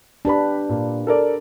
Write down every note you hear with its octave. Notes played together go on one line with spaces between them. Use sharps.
D4 G4 B4 A5 B5
A#2
A4 A#4 D5